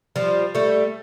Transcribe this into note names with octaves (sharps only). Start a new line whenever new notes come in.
F3 G3
G3 A3